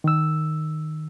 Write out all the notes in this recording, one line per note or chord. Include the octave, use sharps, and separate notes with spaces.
D#3 E6